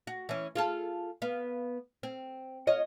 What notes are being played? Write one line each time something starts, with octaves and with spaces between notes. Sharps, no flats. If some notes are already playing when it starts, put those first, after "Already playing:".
F#4
E3 C#4
F4 G#4 A4
B3 F5
C4
F4 C#5 D#5